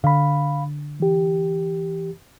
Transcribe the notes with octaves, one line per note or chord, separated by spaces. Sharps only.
D3 F5 B5
E3 G4